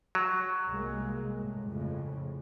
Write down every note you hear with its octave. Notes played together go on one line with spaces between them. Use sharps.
F#3
C2 G#3 A#3
A2
F2 A2 C#3